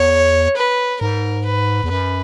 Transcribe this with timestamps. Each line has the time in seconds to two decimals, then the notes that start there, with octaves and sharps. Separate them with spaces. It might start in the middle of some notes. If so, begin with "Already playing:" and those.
Already playing: E2 C#5
0.57 B4
1.01 G#2 A#4
1.46 B4
1.84 E2
1.90 F#2 B4